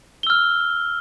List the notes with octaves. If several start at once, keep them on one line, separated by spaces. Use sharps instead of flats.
E6 F6 G7